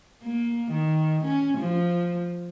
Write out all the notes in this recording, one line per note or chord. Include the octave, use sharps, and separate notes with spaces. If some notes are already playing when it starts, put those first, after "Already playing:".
A#3
D#3
C#4
F3